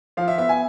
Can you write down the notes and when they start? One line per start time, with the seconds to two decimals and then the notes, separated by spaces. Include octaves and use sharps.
0.17 F3 F5
0.28 E5
0.38 B3 E5
0.49 G#5